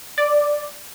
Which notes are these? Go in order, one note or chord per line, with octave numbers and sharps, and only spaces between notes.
D5